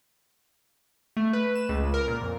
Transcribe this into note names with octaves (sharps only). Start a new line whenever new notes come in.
A3
B4
E7
C#2
A#4
A#2
F2